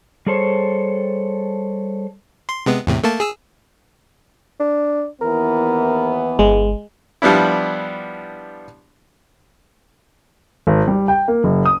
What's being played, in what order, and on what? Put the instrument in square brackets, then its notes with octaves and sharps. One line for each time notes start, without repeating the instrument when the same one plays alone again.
[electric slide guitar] G3 G#4 A4 C5 C#5
[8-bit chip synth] C6
C3 G#3 B3
E2 A2 C3
A3 A#3 A5
G#4 E6
[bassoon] D4
[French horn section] D#2 E3 B3 [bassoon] A#4
[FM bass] G1 [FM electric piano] G#3
[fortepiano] F3 G3 B3 D4 E4
[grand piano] G#1
G3
G5
A#3
F#1
D#6